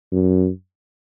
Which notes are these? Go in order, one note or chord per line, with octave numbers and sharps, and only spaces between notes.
F#2